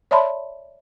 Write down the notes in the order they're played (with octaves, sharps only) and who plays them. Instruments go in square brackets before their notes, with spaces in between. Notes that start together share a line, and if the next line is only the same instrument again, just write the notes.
[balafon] C#5 D5 E5 A5 B5 C6